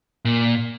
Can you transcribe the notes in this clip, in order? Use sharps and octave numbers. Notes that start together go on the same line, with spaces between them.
A#2